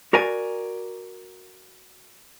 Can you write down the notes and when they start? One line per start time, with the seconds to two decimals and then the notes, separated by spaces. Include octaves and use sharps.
0.13 F#4 A#4 D5 G#5